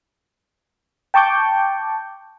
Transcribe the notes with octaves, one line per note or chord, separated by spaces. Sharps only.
G5 A5 C#6 D6 G6